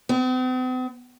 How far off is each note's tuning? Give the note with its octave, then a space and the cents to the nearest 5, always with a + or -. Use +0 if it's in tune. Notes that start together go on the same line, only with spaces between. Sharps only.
C4 -45